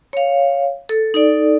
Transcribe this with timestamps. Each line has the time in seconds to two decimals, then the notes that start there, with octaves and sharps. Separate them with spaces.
0.13 C#5 F5
0.89 A4
1.14 D#4 A4 D5